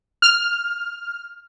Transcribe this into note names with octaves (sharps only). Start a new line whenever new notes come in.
F6